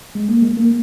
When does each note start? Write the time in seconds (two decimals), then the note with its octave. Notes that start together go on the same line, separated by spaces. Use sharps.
0.15 G#3
0.28 A#3
0.42 G#3
0.57 A#3